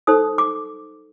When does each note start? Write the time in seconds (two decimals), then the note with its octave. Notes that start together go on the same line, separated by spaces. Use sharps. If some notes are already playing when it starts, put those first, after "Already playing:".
0.07 D#4 A4 C5 D#6
0.38 D6